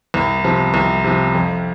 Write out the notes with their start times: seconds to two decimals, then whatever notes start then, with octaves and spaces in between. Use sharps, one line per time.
0.14 C2
0.44 C3 F3
0.74 C2
1.04 C3 F3
1.35 F2